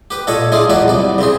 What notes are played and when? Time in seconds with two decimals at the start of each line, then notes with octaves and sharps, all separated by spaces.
0.11 G4 B4
0.27 A#2 A4 C#5 D#5 C#6
0.52 G#3 D4 E4 F4 G#4
0.70 E2 A#2 F#3 B4 D5 C#6
0.88 C2 D5
1.18 C#3 C4 G#4